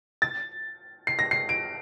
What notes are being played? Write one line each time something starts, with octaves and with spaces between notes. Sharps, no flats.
A6
C7
A#6
C7
D7